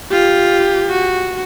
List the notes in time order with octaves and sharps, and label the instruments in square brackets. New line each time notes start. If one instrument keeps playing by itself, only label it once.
[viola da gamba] F4 [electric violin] G4
[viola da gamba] F#4